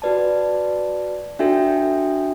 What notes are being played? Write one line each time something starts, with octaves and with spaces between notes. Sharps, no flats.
F#4 B4 D5 A5
D4 F#4 A4 E5 G5